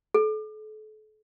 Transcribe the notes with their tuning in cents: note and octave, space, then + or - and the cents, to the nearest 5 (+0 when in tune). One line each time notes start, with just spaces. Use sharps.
A4 -35